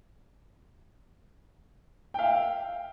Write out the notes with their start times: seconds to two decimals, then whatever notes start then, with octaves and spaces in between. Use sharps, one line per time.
2.14 G5
2.19 F5
2.23 E5